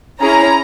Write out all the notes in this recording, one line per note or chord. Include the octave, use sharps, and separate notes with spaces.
C#4 E4 G#4 A#5